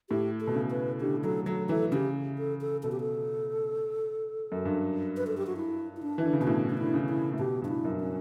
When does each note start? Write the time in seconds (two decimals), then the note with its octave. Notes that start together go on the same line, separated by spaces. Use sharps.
0.09 A2 G4
0.40 A4
0.47 B2
0.55 C#3
0.71 B4
1.01 D3 G4
1.24 F#3 A4
1.46 F#3 A4
1.69 E3 A4
1.92 C#3 G4
2.38 A4
2.61 A4
2.83 B2 A4
2.92 G4
3.00 A4
4.52 F#2
4.65 G2
5.17 B4
5.27 A4
5.37 G4
5.47 F#4
5.56 E4
5.97 E4
6.03 D4
6.18 E3
6.26 D3
6.33 C#3
6.40 B2 E4
6.47 A2 D4
6.70 D4
6.78 D3 E4
6.94 C#3
7.09 E4
7.34 A2
7.39 B2 G4
7.62 G2 F#4
7.69 E4
7.85 F#2
8.00 C#4